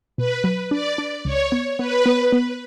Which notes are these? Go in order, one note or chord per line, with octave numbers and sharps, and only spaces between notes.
B2 B4
F#3
D4 D5
D4
C#2 C#5
B3
B3 B4
B3
B3